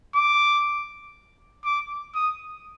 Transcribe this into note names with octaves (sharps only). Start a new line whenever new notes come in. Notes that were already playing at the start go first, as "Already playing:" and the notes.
D6
D6
D#6